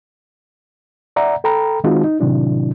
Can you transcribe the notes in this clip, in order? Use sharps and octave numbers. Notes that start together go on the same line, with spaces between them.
D5 E5 F#5 A#5
A4 G5 A#5 B5
D#3 G#3 C4 D#4 F4 F#4
D#4
A2 C3 D#3 F#3 D4 E4